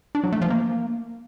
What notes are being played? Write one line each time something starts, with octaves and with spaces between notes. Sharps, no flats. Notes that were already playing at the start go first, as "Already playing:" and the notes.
D4
F#3
A3
F3
A#3